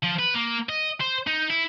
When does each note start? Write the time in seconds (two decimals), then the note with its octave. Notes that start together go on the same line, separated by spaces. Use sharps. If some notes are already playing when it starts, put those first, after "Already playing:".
0.03 F3
0.19 B4
0.34 A#3
0.69 D#5
1.01 C5
1.27 D#4
1.50 E4